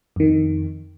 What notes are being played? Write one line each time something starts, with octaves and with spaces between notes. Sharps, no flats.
F2 D#3